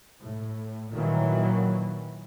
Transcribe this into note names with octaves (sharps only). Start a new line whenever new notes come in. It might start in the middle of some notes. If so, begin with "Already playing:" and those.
A2
A#2 D#3 E3 F#3